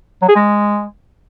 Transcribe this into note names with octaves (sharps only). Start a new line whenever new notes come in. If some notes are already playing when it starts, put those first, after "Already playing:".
F#3
G#4
G#3